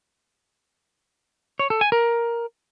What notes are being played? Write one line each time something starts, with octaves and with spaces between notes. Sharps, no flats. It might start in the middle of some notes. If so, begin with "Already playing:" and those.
C#5
A4
G#5
A#4